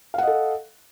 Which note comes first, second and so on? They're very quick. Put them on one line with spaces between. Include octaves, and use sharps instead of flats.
F5 F#5 D#5 A4